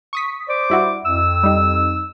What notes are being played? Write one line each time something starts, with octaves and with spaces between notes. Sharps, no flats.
C#6 D#6 B6
C5 D5 D6
G2 E4 F#4
F2 E6
G3 D#4